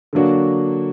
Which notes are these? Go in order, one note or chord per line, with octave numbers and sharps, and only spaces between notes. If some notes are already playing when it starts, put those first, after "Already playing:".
D3 F#3 A#3 D4 F#4